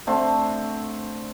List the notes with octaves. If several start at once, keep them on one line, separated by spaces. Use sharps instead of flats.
D3 A3 C4